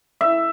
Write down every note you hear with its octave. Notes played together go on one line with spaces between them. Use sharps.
E5